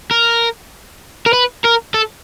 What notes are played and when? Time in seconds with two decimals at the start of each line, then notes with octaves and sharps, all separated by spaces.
0.11 A#4
1.26 A#4
1.33 B4
1.64 A#4
1.94 A4